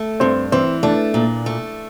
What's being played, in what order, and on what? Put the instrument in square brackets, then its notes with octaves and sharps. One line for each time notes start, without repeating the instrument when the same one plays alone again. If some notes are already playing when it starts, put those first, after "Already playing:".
Already playing: [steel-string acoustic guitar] A3
[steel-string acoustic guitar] G2 [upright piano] C4
[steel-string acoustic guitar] E3 [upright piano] C4
[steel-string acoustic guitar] A3 [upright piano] D4
[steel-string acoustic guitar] A#2
A3